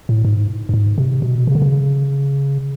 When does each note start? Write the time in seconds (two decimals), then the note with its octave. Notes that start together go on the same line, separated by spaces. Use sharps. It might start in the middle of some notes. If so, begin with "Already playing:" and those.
0.09 A2
0.25 G#2
0.69 G2
0.74 G#2
0.98 C3
1.22 B2
1.47 C#3
1.55 D3
1.62 C#3